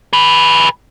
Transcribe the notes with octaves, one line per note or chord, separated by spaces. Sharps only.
G#4 B4